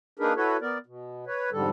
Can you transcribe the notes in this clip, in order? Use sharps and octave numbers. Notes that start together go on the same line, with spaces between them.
A#3 D4 D#4 G#4 A#4 B4
E4 F#4 A4 B4 C#5
B3 A#4 D5
B2
B4 C#5
F2 G#2 D3 G3 A4